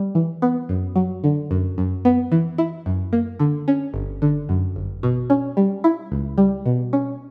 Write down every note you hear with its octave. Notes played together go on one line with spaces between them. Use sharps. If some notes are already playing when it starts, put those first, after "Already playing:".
Already playing: G3
E3
B3
F#2
F#3
D3
F#2
F#2
B3
E3
E4
F#2
A#3
D3
C#4
G1
D3
F#2
G1
B2
C#4
G3
E4
C#2
G3
B2
C#4